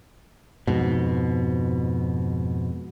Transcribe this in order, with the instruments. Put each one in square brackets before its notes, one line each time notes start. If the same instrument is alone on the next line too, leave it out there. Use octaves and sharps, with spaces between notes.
[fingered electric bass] F2 G#2 B2